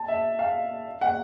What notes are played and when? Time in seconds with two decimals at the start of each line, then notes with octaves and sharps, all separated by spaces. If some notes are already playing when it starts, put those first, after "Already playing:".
Already playing: A5
0.08 E5
0.39 F5
1.01 F#5